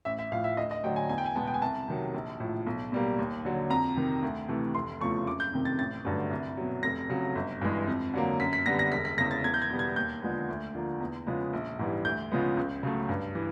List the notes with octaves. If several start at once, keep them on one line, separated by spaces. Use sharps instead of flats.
A1 E5
E5
A2 F3 F5
E5
D2 D#5
D#5
D3 F#3 A3 G5
G#5
E2 G#5
G5
G#5
B2 G#3 B3 A5
G5
G#5
C2 A5
C3 D#3 F#3
A#1
A2 F3
B1
B2 G3 A#3
D#2
D3 F#3
F2 A#5
C3 D#3
D2
C3 E3 A3
F1 C6
E2 C#3 F3 A3 C#6
F#1 D6
G6
F2 C3 D#3
A6
A1 A6
G2 D3 F#3 A3
C2
B2 F#3
F1 A#6
F2 C#3 F#3
G1
G2 E3 G#3
F2
D3 F#3 A#3
F#2 B6
B6
D3 G3 B3 A#6
A#6
E1 B6
B6
E2 C#3 A#6
A6
E2 G#6
G6
G#6
B2 G3 B3
G#6
D#2 G6
D3 F3 G#3 B3
D2
D3 F3 A#3
E2
C#3 F3 G#3 B3
A#1
G#2 E3 G3
D2 G6
C#3 F3 G#3 B3
C#2
C#3 F#3 A3
G2
E3